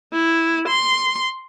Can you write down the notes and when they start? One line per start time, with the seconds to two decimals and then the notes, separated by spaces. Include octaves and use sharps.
0.13 E4
0.68 C6